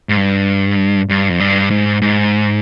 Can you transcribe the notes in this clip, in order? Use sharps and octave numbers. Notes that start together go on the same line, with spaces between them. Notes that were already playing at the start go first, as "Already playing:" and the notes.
G#2
G2
G2
F2
G2
G#2
G#2